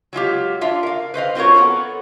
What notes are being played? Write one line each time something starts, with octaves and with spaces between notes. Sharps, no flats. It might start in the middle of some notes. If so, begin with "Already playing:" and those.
F#3 G#3 F4 G4
D4 F4 E5 F5
A#4 F5
B4 C5 D#5 F5
C4 F4 F#4 A#4 C#5
B3 A4 A#4 F#5